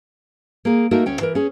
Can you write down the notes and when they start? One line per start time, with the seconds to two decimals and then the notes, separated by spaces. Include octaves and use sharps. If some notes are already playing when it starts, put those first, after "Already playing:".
0.65 A#3 G#4
0.91 A3 A#3 D#4 F#4 A#4
1.06 D2 C#4 G5
1.21 E3 A#4
1.35 C#4 G#4